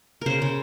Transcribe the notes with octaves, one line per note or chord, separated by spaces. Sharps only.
C#3 A#4 C5
C#3